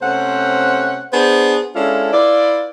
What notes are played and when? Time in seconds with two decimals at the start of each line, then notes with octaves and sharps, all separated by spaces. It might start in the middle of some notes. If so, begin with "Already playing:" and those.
0.02 C3 A3 C4 C#4 C5 F#5
1.12 B3 D4 G#4 C5
1.75 G#3 C#4 D4 E4 F4 A4
2.12 E4 F4 B4 D5